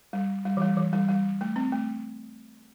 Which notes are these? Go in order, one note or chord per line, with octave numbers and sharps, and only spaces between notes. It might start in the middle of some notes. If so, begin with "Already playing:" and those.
G3
G3
E3
G3
E3
G3
G3
A3
C4
A3